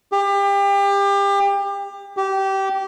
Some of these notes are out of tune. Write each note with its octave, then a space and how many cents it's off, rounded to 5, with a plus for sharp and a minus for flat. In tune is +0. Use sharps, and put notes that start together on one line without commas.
G4 +30
G4 -20